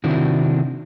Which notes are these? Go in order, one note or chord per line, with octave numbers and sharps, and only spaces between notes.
C3 D#3 C4 D4 E4 F#4